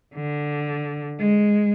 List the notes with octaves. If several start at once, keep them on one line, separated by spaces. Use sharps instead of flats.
D3
G#3